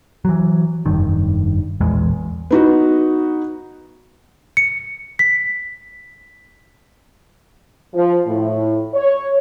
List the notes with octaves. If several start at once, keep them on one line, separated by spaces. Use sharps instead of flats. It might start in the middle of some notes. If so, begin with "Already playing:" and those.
E3 F#3
F1 G2 D#3
E1 A#1 E2 G#3
B3 D#4 F#4
C#7
B6
F3
A2
C#5